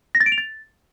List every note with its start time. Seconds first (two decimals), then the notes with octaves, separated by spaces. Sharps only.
0.15 A#6
0.20 A6
0.26 D7
0.32 F7
0.38 A6